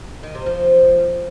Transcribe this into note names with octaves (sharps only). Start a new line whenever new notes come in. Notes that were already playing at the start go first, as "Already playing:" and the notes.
D#3
C3
F3